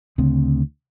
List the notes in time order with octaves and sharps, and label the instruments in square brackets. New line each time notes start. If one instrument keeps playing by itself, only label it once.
[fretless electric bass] D2 C#3 C4